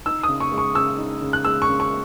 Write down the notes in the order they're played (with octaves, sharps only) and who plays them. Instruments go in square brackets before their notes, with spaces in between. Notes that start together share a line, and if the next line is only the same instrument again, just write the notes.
[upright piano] D#4 E6
C#3 D#6
C#6
G#3
C#6
C#3 E6
D#4
C#3
F#6
G#3 E6
C#6
C#3
C#6